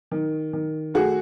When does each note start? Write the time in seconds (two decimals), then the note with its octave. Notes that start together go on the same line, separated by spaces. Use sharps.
0.11 D#3
0.53 D#3
0.94 A3 F#4 G#4